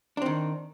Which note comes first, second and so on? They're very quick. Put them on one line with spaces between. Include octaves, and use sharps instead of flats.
D4 C4 D#3